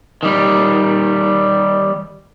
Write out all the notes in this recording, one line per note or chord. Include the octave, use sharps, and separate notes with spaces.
D#3 G3